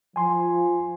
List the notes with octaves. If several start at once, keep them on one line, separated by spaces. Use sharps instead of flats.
F3 G#5 C6